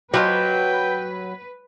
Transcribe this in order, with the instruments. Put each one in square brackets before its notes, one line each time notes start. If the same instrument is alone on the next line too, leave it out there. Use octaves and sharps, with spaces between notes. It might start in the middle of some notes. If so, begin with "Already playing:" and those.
[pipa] B2 F4 G4 [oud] F#3 [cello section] B4 [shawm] G5